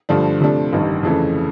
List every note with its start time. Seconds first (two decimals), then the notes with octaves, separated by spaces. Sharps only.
0.09 G2 D3 F3 A3 D4
0.41 C3 F3 A3 D4
0.73 A1 G2 D#3
1.03 F2 C#3 E3 A3